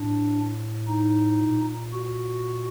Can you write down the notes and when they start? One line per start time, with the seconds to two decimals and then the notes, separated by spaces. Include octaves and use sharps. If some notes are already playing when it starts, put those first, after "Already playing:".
Already playing: A2 D4
0.87 D#4
1.40 A#2
1.92 F#4